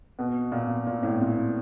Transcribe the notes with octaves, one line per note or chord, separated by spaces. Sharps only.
B2
A#2
A#2
A2
A#2